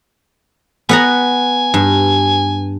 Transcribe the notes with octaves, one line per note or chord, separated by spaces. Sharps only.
B3 F#5 G#5 A#5
G2